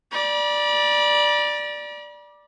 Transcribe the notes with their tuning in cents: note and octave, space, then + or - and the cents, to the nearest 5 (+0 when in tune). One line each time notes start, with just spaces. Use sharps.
D5 +5 B5 -45